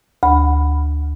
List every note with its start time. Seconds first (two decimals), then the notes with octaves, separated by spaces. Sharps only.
0.23 D2 B5